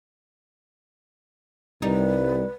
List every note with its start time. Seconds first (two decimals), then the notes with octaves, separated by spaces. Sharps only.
1.82 C2 G3 D#4 B4